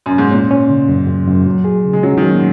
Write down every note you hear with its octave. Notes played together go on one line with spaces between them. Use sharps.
F#2
G#2
A#2 C#4
C#4
C#3
F#2
F#2
F#2
F#3
G#4
C#3
G#3
F#3 C#4
D#3
F#3
A#2